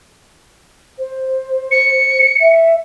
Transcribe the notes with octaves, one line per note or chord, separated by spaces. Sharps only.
C5
C#7
E5